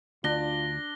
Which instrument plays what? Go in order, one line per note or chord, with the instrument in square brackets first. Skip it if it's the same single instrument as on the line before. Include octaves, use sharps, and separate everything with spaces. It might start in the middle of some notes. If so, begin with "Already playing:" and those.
[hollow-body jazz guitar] D2 [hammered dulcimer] D4 [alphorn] F4 [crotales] A#6 G7